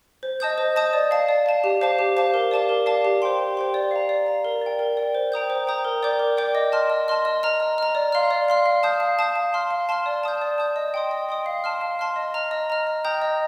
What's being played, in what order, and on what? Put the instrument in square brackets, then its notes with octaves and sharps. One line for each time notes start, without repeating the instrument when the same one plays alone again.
[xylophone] C5
D#5 A5 D#6 G6
C5
D#5 A5 D#6 G6
D5
F5 A5
D5
F5 A5
G4
C5 F5 A5 D6
G4
C5 F5 A5 D6
A#4
D5 F5 A5 D6
A#4
D5 F5 A5 D6
G4
C5 G5 C6
G4
C5 G5 C6
D5
F5 A#5
D5
F5 A#5
A#4
D5 G5
A#4
D5 G5
C5
G5 A#5 D#6 G6
C5
G5 A#5 D#6 G6
A#4
D5 G5 D6 G6
A#4
D5 G5 D6 G6
D#5
A5 C6 F6
D#5
A5 C6 F6
D#5
A#5 F6
D#5
A#5 F6
D5
F5 C6 F6
D5
F5 C6 F6
F5
A5 D#6 G6
F5
A5 D#6 G6
F5
A5 C6 F6
F5
A5 C6 F6
D5
A5 D#6 G6
D5
A5 D#6 G6
D#5
G5 C6 D#6
D#5
G5 C6 D#6
F5
A5 C6 F6
F5
A5 C6 F6
D#5
A#5 F6
D#5
A#5 F6
D#5
G5 A#5 D#6 G6
D#5